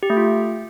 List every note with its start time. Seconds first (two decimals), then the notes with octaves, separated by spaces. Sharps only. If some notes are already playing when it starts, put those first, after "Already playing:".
0.03 G4
0.10 A3
0.17 F4